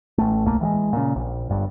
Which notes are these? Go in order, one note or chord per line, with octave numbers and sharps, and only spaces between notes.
A1 A3
D1 B1 A3 A#3
E3 F#3 G#3
A#2 C#3
A#1
G1 G2